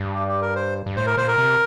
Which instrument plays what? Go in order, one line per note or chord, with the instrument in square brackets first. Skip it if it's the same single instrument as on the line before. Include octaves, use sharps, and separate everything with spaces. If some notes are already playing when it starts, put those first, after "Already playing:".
Already playing: [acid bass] G2
[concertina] G4
G4
A#4
C5
[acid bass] G2
[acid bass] A2 [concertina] C5
[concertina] A#4
[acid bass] A#2 [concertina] C5
[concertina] A#4
[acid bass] C3